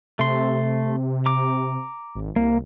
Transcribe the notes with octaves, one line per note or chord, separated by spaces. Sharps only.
C3 A3 C6
A#5 D6
G#1
C2 A#3